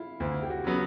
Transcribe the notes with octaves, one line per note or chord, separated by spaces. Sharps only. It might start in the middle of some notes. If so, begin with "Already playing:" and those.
Already playing: E4 F4
D2 F4
G4
F#4
C#3 F#3 B3